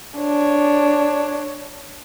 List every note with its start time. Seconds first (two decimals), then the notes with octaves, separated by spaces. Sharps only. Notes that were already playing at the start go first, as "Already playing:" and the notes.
0.19 D4 C#5